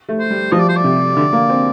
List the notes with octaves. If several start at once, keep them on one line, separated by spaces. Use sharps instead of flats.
A3
C5
G3
F3 D#5
D5
C5
D5
C3
D3
A#3
C4